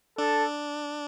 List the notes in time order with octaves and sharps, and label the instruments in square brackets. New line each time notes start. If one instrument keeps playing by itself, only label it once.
[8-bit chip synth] D4 [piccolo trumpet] A4